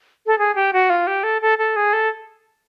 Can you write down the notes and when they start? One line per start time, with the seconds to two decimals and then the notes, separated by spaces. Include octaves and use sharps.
0.26 A4
0.39 G#4
0.55 G4
0.73 F#4
0.90 F4
1.07 G4
1.23 A4
1.42 A4
1.58 A4
1.76 G#4
1.93 A4